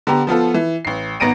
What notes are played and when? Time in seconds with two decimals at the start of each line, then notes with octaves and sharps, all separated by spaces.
0.07 D3 B3 G4 A#5
0.27 F3 B3 F4 A4
0.54 E3
0.85 A1 C7
1.20 G#1 B3 A#5 A#6 D7 D#7